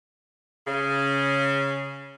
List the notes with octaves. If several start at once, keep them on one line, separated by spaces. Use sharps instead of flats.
C#3